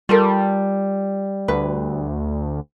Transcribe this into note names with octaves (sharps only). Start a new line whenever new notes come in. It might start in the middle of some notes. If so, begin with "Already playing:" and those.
G3 F4 A4 A#4
D2 B4